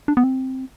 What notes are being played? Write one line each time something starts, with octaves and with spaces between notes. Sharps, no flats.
D4
B3
C4